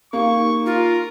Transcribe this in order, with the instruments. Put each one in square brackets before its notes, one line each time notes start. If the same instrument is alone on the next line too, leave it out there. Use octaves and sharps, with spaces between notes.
[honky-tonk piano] A#3 [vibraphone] D#4 G4 [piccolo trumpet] C#6
[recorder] F4 [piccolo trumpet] A#4